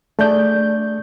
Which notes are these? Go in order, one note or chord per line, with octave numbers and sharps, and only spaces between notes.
A3 D4 G#4 D5 G6